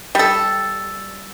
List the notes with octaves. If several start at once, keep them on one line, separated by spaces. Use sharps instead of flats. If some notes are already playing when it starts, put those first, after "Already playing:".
G3 A4